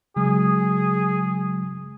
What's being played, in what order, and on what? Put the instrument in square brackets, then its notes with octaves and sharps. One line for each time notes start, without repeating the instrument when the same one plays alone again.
[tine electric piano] C#3 F#3 G#3 [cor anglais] G#4